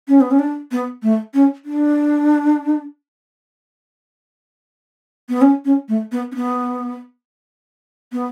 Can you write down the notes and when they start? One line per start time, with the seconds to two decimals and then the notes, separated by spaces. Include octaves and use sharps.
0.08 C#4
0.21 B3
0.31 C#4
0.39 D4
0.72 B3
1.03 A3
1.34 C#4
1.65 D4
5.29 B3
5.42 C#4
5.65 C#4
5.89 A3
6.12 B3
6.32 C#4
6.35 B3
8.12 B3